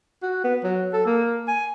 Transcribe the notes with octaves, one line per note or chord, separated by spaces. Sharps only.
F#4
B3
F#3
A4
A#3
G#5